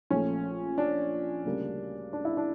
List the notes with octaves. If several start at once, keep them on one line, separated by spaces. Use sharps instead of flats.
A#1 A#2 F3 A3 C#4
D4
D2 C#3 G3 A#3
D4
E4
D4